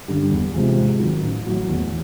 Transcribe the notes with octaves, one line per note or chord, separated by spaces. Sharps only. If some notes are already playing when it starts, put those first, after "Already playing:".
G2 D3 G3
E2
C3 F3 G#3
G#2
D#3 F#3
A1
A2 F#3
E2